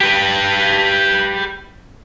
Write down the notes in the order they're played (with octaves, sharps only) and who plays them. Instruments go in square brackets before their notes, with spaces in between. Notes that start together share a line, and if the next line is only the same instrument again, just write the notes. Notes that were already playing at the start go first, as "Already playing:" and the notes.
[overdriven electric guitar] G4 B4